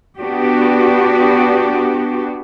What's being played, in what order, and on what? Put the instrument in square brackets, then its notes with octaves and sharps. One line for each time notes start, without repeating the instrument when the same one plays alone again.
[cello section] B3 D4 F#4 G4